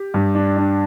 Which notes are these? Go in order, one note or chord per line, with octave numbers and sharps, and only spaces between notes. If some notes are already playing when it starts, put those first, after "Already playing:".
Already playing: G4
G2
D4
D4